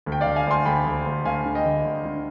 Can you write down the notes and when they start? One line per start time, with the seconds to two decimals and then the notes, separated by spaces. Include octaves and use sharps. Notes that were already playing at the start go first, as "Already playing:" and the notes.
0.06 D2
0.12 G5
0.21 D2 D5 F5
0.36 F5 G#5
0.47 D2 G#5 C6
0.65 D2 G5 B5
0.86 D2
1.06 D2
1.25 D2 F5 G#5
1.45 D3
1.55 D#5 G5
1.65 D2
1.85 D2
2.05 D3